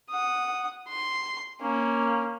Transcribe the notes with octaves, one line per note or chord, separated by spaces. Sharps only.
F#5 D#6
C6
A#3 C#4